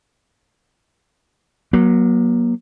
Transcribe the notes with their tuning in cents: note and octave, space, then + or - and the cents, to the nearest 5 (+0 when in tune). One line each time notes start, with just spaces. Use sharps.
F#3 +0 A#3 +35